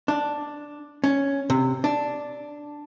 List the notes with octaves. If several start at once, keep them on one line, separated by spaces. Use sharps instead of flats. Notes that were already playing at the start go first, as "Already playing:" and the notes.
D4
C#4
C3
D4